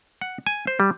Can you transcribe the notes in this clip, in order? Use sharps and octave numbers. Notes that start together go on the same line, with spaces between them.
F#5
G#5
C5
G3